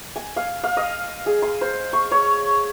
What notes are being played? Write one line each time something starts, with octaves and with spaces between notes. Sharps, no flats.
G#5
F5
F5
D#5
G#4
C6
C5
C#6
C#5